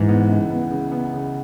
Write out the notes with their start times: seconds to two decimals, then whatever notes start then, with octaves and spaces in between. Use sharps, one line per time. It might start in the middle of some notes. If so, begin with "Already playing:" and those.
Already playing: G#2 E3
0.09 B3
0.29 C#2
0.50 B3
0.71 C#3
0.92 B3
1.14 C#3